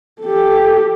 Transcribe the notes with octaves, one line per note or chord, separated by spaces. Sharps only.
G4 A4